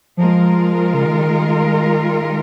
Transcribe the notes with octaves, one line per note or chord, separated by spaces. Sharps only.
F3 G#3 F4 A#4
C#3
D#3